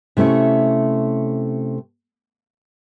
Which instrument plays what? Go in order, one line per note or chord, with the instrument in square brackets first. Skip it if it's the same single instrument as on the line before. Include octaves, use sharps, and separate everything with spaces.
[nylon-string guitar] C3 A3 C#4 E4 C#5